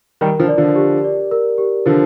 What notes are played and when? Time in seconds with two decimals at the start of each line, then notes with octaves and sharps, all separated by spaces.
0.21 D#3 G3 A#4
0.39 D3 F3
0.48 D5
0.58 D3 F3
0.76 G4
1.04 D5
1.31 A#4
1.58 G4
1.86 D3 F3 A#4